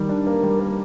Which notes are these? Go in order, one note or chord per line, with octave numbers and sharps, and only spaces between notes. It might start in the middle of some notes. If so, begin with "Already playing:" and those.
Already playing: D#3 G3
D4
A#3
G3
A#3